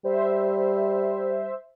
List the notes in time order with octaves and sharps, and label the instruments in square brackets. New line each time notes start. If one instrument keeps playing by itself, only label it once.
[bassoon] G3 [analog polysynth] C5 E5